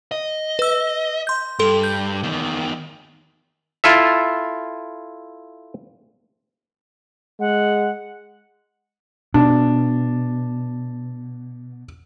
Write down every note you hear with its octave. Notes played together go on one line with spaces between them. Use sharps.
D#5
B4 E6
C6 G6
G2 A4 C6
G6
E2 D#3
E4 F4 A4 E5
G#3 F#5
B2 D4